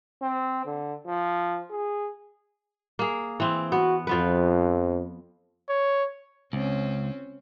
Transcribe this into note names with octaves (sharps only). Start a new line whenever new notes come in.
C4
D3
F3
G#4
A#3 G#4
E3 C4
B3 F#4
F2 F3 B3 B4
C#5
C#2 C4 C#4